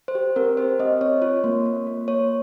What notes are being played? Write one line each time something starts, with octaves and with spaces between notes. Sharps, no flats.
C5
G4
C4 A#4
G4 C5
C4 D#5
C4 C#5
F4 C#5
A#3
A#3
A#3
A#3 C#5